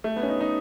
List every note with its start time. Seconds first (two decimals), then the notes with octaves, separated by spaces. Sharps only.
0.04 A3
0.16 B3
0.23 C#4
0.29 D#4
0.41 D#4